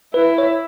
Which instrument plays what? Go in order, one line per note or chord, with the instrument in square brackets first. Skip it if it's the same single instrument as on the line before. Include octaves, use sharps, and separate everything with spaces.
[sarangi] E4 [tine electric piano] B4
[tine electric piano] C#5